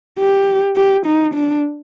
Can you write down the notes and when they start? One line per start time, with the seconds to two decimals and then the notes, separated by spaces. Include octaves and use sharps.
0.19 G4
0.76 G4
1.06 D#4
1.34 D4